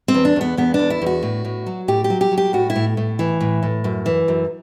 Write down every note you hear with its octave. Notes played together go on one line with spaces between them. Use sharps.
C4
E2
D4
E2 B3
E2 B3
D4
E2
E4
E2 F#4
A2
A2
F#3
A2 G4
G4
F#3
G4
F#3
G4
A2 F#4
E4
A2
A2
E3
A2
A2
F#2
E3
F#2